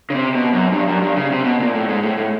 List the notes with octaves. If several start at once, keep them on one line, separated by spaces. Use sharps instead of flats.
C#3
C3
B2
F#2
G2
F#2
G2
C#3
C3
B2
A#2
A2
G#2
A2
A2